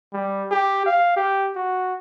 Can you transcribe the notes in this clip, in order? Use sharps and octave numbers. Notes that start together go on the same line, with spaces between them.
G3
G4
F5
G4
F#4